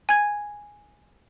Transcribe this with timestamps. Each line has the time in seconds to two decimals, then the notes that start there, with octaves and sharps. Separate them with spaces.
0.09 G#5 G#6